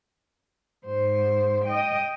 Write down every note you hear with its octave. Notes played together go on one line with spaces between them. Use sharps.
G#2 C5
D#5 G5